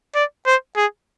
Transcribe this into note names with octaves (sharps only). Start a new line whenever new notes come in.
D5
C5
G#4